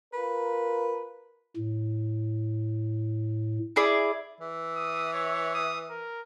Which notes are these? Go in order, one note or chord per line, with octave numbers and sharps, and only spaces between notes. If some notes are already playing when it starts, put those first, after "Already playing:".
F4 A#4 B4
A2
E4 G#4 D5
E3
D#6
C#5
D#6
A#4